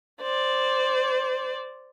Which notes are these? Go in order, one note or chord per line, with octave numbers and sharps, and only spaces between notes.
C5 D5